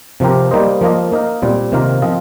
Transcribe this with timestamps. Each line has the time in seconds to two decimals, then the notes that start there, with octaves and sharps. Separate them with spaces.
0.20 C3 F3 C4 G4 A#4
0.51 G3 A#3 D#4 C5 D#5
0.81 F3 A#3 F4 D#5
1.12 A#3 D#4 A#4
1.42 A#2 G3 C4
1.72 C3 D#3 A#3 F4 A#4
2.02 F3 C4 F4 D#5